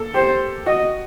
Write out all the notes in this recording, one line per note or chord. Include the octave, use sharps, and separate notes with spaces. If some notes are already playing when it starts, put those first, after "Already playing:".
Already playing: A#3 A4
G4 C5
F#4 D#5